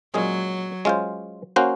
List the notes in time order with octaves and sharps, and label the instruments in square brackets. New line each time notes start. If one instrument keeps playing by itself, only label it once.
[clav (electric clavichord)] A#2 G#3 C#4 G#4 [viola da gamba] F#3
[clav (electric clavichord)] G#3 C#4 F4 C5
A#3 C#4 F#4 C5